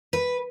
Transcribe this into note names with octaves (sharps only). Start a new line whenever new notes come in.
B4